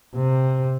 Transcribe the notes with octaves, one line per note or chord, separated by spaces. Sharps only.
C3